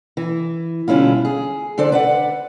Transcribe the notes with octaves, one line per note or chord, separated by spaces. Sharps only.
E3
B2 D3 G3 C#4 E4 F4
G#4
D3 D4 A4 C5 D5
B4 D5 F#5